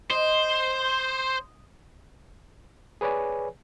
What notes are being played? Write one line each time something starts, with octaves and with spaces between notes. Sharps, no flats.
C5 D#5 C6
G#4 B4 C#5 D5 G#5